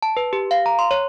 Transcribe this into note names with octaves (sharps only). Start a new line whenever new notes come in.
A5
B4
G4
F5
A#5
C6
C#5